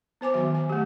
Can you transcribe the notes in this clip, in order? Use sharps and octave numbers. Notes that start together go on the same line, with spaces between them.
B3 C5 G#5 D6
D#3 F#3 F#4 E5
G#5
A3 G4